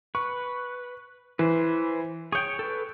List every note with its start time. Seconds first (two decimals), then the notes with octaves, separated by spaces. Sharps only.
0.15 B4 C#6
1.39 E3 B4 C5
2.32 G#4 C#5 G5 C#6 G6
2.59 A4 B4